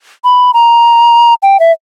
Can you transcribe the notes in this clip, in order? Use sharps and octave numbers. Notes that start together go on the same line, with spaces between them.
B5
A#5
G5
E5